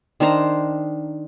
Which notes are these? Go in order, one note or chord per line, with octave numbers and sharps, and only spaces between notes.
D#3 D4 C5 A#5